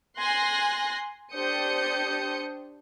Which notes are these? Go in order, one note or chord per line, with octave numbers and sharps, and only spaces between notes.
G#5 C6 F#6 A#6
D4 G4 C5 D#6 G6 C#7